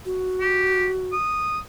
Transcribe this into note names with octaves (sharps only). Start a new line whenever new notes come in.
F#4
G4
D#6